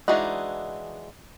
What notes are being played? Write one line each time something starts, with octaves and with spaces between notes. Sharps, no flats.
E3 G#3 D4 D#4 F#4